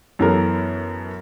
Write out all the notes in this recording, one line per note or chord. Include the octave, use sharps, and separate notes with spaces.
F#2 E3 B3 A4 A#4